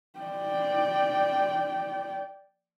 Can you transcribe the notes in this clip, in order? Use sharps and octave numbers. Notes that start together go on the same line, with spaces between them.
D5 G5